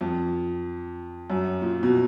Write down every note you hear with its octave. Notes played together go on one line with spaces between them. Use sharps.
F2
F#2
A#2
B2